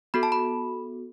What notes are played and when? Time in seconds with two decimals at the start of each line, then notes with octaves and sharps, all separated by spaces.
0.14 B3 F#4 A4 B5
0.23 A5
0.32 B5